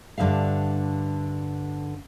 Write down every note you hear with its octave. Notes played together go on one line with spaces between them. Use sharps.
G2 D3 D#3 E5 F5